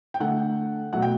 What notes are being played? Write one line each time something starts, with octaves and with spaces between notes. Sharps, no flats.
G5
D3 A3 F#5
B2 F#3 A3 F#5
G5